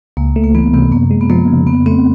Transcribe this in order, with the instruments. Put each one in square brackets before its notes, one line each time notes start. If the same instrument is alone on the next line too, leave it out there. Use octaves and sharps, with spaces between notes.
[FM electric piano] C#2 [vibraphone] A#3
[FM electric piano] A3
[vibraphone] A#3
[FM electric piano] E3 [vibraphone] B3
[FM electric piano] C3 [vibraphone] B3
[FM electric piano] F#2 [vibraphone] A#3
[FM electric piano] G#3
[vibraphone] B3
[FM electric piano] F3 [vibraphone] A#3
[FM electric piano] C#3
[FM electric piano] F2 [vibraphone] B3
[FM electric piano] A3 [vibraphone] C4